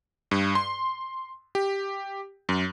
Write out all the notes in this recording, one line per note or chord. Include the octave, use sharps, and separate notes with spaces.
G2
C6
G4
F#2